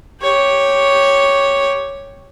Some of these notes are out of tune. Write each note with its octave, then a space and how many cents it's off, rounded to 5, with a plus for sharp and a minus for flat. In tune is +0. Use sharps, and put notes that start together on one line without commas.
G4 +0 C#5 +0